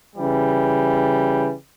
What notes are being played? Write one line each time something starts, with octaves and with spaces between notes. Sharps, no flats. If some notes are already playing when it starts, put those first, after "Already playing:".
C#3 E3 G3